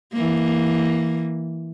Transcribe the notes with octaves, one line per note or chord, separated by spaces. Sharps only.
E3 A#3